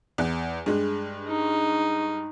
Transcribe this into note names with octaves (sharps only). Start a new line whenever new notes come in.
E2
G2 G#3
D#4